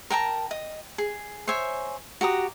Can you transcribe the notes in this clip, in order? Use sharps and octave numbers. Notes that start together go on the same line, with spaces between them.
A#4 G5 A5 A#5
D#5
G#4
C5 C#5 E5 G#5
F#4 G4 A#5 D#6